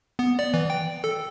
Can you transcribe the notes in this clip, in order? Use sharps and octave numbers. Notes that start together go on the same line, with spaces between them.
B3
D5
E3
G5
A4